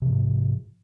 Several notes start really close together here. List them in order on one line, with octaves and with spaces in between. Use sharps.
C3 F3 G#2